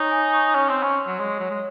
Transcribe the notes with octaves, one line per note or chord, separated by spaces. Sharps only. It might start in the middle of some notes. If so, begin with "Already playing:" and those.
Already playing: D#4 C#5 G#5 C#6
G#5
C#6
C#4 C#5
C4
C6
C#4
C6
F#3
G#3 C#5
F#3 C#5
G#3